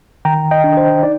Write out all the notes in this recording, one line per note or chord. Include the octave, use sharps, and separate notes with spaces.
D#3 G5 A#5
D#5 G5
D4
C5
D#4 D5